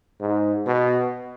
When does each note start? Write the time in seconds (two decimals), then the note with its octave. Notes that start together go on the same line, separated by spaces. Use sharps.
0.21 G#2
0.67 B2